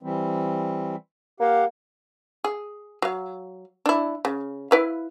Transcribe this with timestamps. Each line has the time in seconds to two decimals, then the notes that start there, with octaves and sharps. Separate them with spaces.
0.03 E3 G3 C4
1.40 A#3 G4 F5 F#5
2.44 G#4
3.02 F#3 F5
3.86 D4 E4
4.25 C#3
4.71 E4 B4 F5